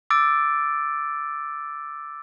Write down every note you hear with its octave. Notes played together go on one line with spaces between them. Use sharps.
D6 E6 A6 D7